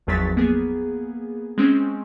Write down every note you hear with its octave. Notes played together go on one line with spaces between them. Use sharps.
G#1 E2 F3 F#3 A6 B6
A#3 B3 G#4
G#3 C4 C#4